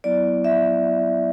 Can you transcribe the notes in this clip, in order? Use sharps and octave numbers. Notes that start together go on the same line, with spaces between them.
F#3 B3 E4 D5
E5